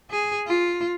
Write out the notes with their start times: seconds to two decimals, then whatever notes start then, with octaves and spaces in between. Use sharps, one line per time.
0.11 G#4
0.47 F4